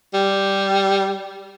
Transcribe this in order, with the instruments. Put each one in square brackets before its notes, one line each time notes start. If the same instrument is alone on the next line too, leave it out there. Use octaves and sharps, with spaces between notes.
[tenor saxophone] G3